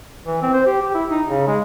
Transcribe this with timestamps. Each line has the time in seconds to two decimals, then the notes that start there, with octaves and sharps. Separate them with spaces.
0.26 E3
0.42 C4
0.53 C5
0.66 G4
0.82 G4
0.94 E4
1.10 D#4
1.28 C#3
1.48 G#3